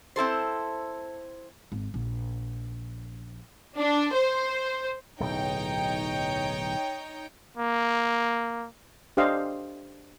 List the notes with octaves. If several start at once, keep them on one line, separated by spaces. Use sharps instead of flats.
C4 E4 A4 C5
G#1
A#1
D4
C5
D1 B1 D#4 C#5 G5
A#3
D4 G4 C5 D#5 F5